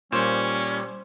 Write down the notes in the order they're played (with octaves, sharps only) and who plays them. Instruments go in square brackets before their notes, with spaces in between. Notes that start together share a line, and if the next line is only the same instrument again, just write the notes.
[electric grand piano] A#2 [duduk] G3 [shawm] C#4 [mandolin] C5